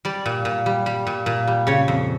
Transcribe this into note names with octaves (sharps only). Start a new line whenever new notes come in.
G3 D5
A#2
A#2
G3
G3
A#2
A#2
G3
C#3 C#5
F2